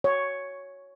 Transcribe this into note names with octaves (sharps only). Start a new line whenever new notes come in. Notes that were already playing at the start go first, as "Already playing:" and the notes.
C#5